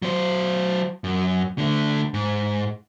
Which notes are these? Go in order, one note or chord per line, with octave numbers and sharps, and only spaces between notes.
F#3 C5
F#2
D3 A3
G#2